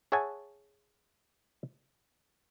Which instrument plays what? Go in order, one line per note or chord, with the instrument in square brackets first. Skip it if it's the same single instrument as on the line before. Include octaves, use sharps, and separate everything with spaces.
[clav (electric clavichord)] G#4 C#5 E5 F#5 G#5 A5